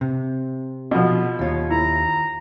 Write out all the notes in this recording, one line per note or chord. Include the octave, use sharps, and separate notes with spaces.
C3
B2 F3 B3
D#2 F4 C#5
E4 A#5